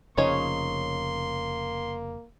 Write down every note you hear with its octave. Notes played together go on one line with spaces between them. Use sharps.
F1 C#3 F3 A#3 C#4 D#4 C#5 C6